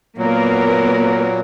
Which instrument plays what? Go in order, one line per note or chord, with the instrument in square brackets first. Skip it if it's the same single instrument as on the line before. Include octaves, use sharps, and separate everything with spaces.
[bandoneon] A#2 F#3 [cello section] A#3 B3 A#4